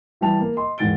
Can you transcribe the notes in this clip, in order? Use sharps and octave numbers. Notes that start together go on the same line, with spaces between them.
E3 G3 B4 E5 A5 F7
A#3
D#5 C6
E2 G#2 D#3 A6 D7 G7